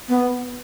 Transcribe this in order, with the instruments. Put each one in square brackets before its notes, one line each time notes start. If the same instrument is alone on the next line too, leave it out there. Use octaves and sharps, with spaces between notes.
[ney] B3